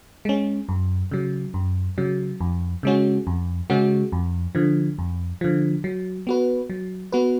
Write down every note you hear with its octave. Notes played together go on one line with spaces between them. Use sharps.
G#3 C#4
F#2
C#3 F#3
F#2
C#3 F#3
F2
C#3 G#3 C#4 F#4
F2
C#3 G#3 C#4 F#4
F2
D3 F3
F2
D3 F3
F#3
B3 F#4 B4
F#3
B3 F#4 B4